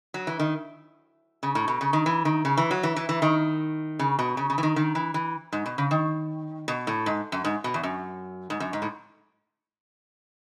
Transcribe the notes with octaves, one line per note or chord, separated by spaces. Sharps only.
F#3
E3
D#3
C#3
A2
B2
C#3
D#3
E3
D#3
C#3
E3
F#3
E3
E3
E3
D#3
C#3
B2
C#3
C#3
E3
D#3
D#3
E3
E3
G#2
B2
C#3
D#3
B2
A2
G#2
F#2
G#2
B2
E2
F#2
G#2
F#2
G#2
A2